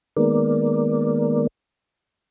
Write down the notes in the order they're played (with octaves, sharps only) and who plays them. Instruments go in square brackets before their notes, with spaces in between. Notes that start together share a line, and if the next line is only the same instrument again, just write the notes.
[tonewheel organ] D#3 G#3 A#3 B3 A#4 D5